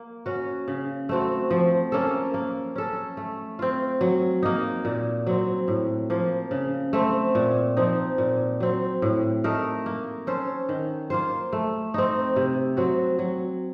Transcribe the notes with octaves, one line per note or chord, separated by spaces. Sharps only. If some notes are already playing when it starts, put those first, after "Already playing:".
Already playing: A#3
C#4 F#4
C#3
A3 C4 F#4
F3
A#3 C#4 A4
A#3
C#4 A4
A3
C4 F4
F#3
A#3 D#4
A#2
F#3 C4
A2
F3 A#3
C#3
A3 C4
A#2
F3 C4 D#4
A#2
F#3 C4
A2
A3 D#4 A#4
A#3
C#4 A4 C5
D#3
A#3 F4 C5
A3
C4 D#4
C3
F#3 C4 F#4
F#3